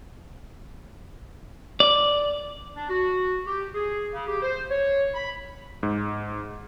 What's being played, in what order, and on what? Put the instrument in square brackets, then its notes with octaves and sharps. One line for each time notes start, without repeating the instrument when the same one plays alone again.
[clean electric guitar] D5
[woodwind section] D4
F#4
G4
G#4
C#3
G4
C5
C#5
B5
[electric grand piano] G#2